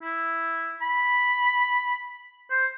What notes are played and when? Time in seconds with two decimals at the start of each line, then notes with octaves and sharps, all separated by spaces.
0.02 E4
0.81 B5
2.50 C5